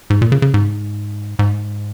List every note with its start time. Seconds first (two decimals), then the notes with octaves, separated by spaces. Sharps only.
0.10 G#2
0.22 A#2
0.32 C#3
0.42 C#3
0.54 G#2
1.39 G#2